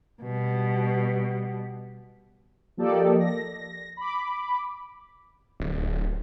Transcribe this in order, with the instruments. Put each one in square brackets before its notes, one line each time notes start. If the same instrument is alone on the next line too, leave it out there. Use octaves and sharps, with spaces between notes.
[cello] B2 G3
[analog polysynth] F3 A#3 G4 A4 D5 D#5
A#6
B5 D6
[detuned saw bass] D1